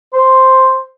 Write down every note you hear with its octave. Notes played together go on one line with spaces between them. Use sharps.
C5